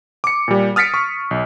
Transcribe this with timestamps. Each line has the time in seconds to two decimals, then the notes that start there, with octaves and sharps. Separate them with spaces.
0.24 D6 C#7
0.48 A#2 G3
0.76 D#6 F6 A6 B6 C#7 D7
0.94 C#6
1.31 B1